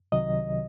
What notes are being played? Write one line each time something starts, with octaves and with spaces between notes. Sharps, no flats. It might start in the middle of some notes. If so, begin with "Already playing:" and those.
C2 C3 D#3 F#3 D#5